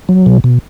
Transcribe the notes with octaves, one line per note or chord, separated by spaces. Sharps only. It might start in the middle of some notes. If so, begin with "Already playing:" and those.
F#3
B2
B2